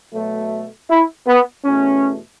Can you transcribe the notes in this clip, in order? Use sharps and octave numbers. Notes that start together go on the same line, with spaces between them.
B2 F#3 A3
E4
B3
E2 B2 A3 C#4